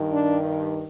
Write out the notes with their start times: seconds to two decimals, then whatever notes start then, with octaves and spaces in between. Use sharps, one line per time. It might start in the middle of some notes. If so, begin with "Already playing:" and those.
Already playing: G2 D#3
0.11 D4